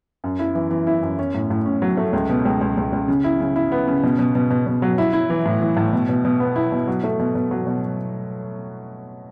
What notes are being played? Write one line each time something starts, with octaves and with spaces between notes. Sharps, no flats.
F#2
E4
E3
E3
E4
F#2
C#4
A2
A2
C#4
F#3
A3
C#2
B2
C#2
C#2
C#2
C#2
C#3
E4
C#3
E4
B3
C#3
B2
B2
B2
B2
B2
F#3
E4
E4
E3
A2
E3
A2
B2
B2
B2
B3
E4
B2
F#3
A3
B2
B2
F#3
B2